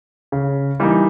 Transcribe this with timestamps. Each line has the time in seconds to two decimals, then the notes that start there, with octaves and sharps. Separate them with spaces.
0.32 C#3
0.80 E3 G3 A#3 D#4